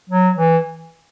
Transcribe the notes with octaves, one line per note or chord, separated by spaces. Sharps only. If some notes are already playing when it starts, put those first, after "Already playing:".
F#3
E3